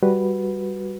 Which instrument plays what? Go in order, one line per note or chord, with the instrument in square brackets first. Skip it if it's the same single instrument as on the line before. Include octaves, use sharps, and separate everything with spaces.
[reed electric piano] G3 F#4 B4